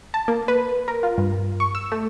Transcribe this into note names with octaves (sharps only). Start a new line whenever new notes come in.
A5
A#3
B4
A#4
F4
G2
C#6
E6
A3